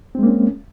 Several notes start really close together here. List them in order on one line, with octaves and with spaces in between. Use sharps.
C4 G#3 A#3 C#4